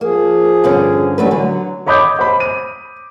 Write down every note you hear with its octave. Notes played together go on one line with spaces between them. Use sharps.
F3 A#3 G#4
G2 D3 C#4
E3 F#3 G3 A3 C#4 B4
D3 F#3
C#5 D#5 B5 D6 D#6 G6
C5 B5
D#7